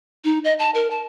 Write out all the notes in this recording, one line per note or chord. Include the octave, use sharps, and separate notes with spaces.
D#4
D#5
A5
A#4
A5